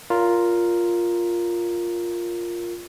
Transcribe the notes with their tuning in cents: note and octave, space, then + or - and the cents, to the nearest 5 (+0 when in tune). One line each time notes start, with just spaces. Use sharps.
F4 +0 A#4 +0 C#5 +35